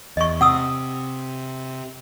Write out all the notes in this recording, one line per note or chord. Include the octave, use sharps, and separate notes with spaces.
E2 D#5 C#6
C3 F#5 D#6 E6